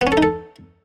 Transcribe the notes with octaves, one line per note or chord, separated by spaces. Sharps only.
B3
C#4
A4
D#4
A4